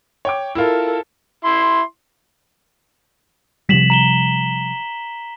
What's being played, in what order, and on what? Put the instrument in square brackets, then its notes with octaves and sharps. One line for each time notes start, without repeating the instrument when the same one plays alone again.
[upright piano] C#5 G5 D6
[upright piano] E4 F4 [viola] A4 A#4
[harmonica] E4 C6
[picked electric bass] C3 F3 G3 [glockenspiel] B6 E7 F#7
[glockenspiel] A#5 E7 G7